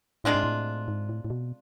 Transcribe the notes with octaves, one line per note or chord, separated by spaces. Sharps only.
A2 C3 G#3 D4 F4
G#2
A2
G#2
A2
A2
B2